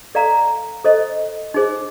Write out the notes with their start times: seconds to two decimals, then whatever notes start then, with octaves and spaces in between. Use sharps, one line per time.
0.15 A4 D5 F5 A#5
0.85 A4 C5 D#5
1.54 D#4 G#4 C5